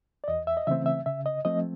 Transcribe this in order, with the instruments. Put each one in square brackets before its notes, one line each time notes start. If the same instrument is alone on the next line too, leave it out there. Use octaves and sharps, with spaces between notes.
[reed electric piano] D5
E2 D#5
E5
D#5
C#3 E3 A3 C4 E5
E5
C#3 E5
D#5
F3 A3 C4 D#5